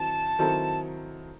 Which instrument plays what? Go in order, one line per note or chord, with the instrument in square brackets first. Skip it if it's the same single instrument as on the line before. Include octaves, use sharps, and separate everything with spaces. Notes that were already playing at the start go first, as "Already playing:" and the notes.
Already playing: [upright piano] D#3 F#3 C4 E4 [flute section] A5
[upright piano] D#3 F#3 C4 E4 A4